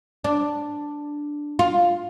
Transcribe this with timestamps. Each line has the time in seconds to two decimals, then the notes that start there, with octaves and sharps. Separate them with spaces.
0.24 D4
1.59 F4